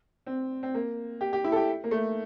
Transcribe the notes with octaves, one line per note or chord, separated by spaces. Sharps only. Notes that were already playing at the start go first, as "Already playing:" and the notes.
C4
C4
A#3
G4
G4
E4
A4
G4
A#3
A3